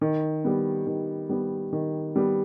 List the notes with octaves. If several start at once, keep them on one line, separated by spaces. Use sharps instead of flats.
D#3
G3 B3
D#3
G3 B3
D#3
G3 B3